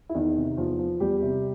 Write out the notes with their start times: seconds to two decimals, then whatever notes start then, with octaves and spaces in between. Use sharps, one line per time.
0.09 E4
0.15 E2 D#3 D#4
0.36 C3
0.57 E2 F3 F4
0.79 F3
1.00 E2 G3 G4
1.22 C3